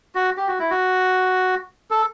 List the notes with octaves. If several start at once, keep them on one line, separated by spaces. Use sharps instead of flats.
F#4
G4
F#4
E4
F#4
A4